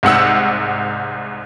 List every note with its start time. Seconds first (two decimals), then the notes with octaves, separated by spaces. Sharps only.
0.03 C2 G#2 F#5 E6